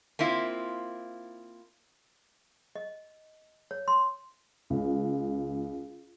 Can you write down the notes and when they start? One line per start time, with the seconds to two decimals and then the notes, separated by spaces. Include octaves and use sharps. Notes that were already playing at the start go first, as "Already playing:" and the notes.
0.19 A#3 C4 E4 F4
2.76 D#5
3.71 C#5
3.88 C6
4.70 C#2